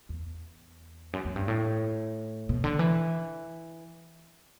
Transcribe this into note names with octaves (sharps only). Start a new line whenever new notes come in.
E2
F#2
F#2
G2
A2
B2
D3
E3